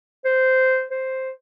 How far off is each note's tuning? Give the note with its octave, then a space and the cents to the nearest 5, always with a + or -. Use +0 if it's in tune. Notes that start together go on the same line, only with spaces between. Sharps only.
C5 -10
C5 +5